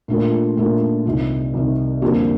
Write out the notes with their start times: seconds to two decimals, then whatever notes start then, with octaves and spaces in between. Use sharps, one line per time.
0.08 A#2 A3 D4 F4 A#4
0.57 A#2 A3 D4 F4 A#4
1.05 C2 C3 D#3
1.54 C2 C3 D#3
2.02 F2 D3 G3 A#3